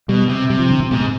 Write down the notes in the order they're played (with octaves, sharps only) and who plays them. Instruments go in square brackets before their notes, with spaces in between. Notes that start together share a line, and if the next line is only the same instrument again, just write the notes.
[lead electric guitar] B2 [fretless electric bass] G3
[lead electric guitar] C3
[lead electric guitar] C3 [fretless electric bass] G3
[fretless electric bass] F3
D3
C3
[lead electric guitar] G#2 [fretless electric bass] B2
[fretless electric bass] C3